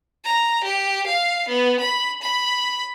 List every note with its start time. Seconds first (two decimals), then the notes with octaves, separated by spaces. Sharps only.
0.25 A#5
0.63 G4
1.07 F5
1.48 B3
1.80 B5
2.22 B5